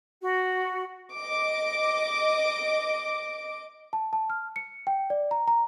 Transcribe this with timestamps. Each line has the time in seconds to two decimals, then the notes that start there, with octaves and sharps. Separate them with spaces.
0.23 F#4
1.15 D#5 D6
3.93 A5
4.13 A5
4.30 F6
4.56 C#7
4.87 G5
5.10 D5
5.31 A#5
5.48 A#5